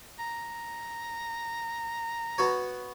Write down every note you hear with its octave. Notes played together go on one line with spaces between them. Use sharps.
A#5
B3 F#4 C#5